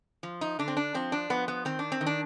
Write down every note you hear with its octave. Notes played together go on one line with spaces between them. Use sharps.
F3
D#4
D3 D4
C4
D4
F3 C4
D4
F3 B3
B3
D#3 C4
D4
C4
D#3
D4